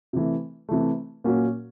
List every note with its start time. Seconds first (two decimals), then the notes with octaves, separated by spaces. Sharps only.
0.13 C3 E3 A3
0.69 C3 E3 A3
1.24 A#2 F#3 A#3 C#4 F#4